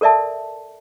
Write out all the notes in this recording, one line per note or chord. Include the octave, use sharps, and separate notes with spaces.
A4 A#4 D5 E5 A5